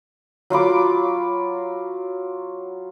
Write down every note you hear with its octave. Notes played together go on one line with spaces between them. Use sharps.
F#3 F4 B5 D6